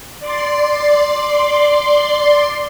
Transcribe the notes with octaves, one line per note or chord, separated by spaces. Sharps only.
D5 C6